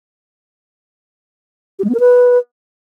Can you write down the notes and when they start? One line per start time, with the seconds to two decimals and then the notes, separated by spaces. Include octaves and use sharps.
1.79 G4
1.84 G#3
1.89 B3
1.95 A#4
2.00 B4